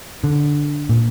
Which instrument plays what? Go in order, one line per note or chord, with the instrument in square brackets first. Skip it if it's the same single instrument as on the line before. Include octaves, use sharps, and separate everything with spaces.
[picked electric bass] D3
A#2